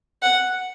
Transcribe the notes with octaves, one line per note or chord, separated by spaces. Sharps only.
F#5